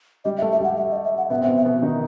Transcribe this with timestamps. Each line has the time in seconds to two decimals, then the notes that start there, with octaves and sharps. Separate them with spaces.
0.25 G3 G4 D#5
0.38 E5
0.42 A3 A4
0.52 E5
0.60 G3 G4 F#5
0.77 E5
0.91 D#5
1.04 E5
1.18 F#5
1.30 B2 B3 E5
1.41 C4 E5
1.47 B2 B3
1.57 E5
1.65 B2 B3
1.82 D#3 D#4